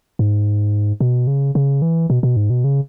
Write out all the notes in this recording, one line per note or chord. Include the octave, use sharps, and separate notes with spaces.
G#2
B2
C#3
C#3
E3
B2
B2
G#2
B2
C#3